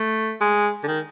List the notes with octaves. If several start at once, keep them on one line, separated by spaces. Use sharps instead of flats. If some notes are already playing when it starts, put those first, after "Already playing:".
Already playing: A3
G#3
D3
D#3